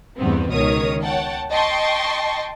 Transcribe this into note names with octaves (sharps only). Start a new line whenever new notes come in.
E2 G2 A3 B3 C4
C#2 B2 D#3 A#4 C#5 D#6
C#5 F#5 G5 A5
D#5 G5 A5 C6 C#6